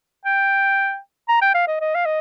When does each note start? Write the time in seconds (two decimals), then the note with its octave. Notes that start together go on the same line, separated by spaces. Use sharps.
0.25 G5
1.28 A#5
1.42 G5
1.54 F5
1.68 D#5
1.81 D#5
1.95 F5
2.06 D#5